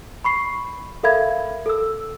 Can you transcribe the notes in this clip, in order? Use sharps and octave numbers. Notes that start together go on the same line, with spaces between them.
B5 C#6 C7
A4 A#4 E5 F5 B5 G#6
A4 E6